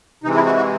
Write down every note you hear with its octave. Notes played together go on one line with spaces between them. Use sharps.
C3 E3 G#3 D#4
E4
F#4
F#4